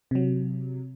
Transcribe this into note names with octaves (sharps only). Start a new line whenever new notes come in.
C3 F#3